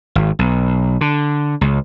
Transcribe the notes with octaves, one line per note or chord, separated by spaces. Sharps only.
G#1
B1
D3
C#2